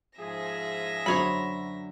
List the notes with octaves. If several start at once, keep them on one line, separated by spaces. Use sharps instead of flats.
G#2 F3 G#4 E5 A#6
F#2 D3 F#3 C5 C#5 B5